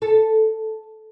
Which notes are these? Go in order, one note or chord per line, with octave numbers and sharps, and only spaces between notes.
A4